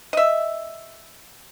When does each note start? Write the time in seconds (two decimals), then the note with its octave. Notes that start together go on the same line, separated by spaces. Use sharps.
0.13 D#5 E5